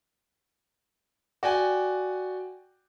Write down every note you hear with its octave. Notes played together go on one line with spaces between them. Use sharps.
F#4 D5 G5 G#5